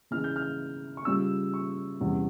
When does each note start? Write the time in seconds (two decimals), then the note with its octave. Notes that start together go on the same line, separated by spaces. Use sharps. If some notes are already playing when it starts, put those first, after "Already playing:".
0.11 C#3 E3 G#3 F6
0.24 G6
0.36 F6
0.97 C#6
1.05 C#3 G3 C#4 F4 E6
1.54 C#6
2.00 E2 C3 G3 C#4